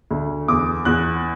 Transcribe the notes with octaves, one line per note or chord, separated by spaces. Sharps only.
D2
E2 D6
E2 F#6